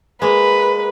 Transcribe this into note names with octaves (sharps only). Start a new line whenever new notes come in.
G#3 A#3 B4